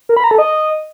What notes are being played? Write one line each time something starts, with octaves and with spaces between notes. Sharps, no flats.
A#4
B5
A#5
A4
D#5